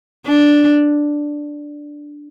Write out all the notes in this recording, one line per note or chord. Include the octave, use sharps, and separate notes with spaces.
D4